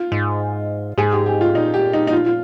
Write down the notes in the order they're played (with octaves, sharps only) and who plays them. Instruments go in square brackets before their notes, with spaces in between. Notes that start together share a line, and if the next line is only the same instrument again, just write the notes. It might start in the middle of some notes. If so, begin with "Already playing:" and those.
Already playing: [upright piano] F4
[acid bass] G#2
[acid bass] G#2 [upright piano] G#4
[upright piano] G4
G4
F4
[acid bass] A#2 [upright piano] D#4
[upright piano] G4
D#4
D#4
F4
F4